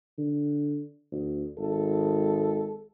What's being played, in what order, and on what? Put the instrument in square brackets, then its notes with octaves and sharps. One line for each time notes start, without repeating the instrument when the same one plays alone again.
[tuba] D3
D2
[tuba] G#1 [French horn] A4